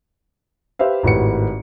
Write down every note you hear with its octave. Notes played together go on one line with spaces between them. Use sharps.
G4 B4 C5 E5 F5
G#1 A2 F#4 G4 B4 C#7